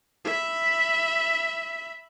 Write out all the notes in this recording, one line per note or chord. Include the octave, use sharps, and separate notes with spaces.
E5 B5